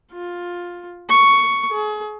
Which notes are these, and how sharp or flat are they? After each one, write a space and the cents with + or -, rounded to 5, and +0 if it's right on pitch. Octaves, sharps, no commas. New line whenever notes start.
F4 +10
C#6 +5
G#4 +35